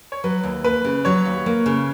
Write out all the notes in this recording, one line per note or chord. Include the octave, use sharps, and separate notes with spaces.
C#5
F#3 B4
D#2
A#3 B4
C#3
F#3 C#5
D#2
A#3
C#3